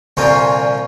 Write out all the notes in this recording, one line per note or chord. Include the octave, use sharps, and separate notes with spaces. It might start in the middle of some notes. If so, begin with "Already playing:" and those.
C2 A#2 D3 C#4 F4 C5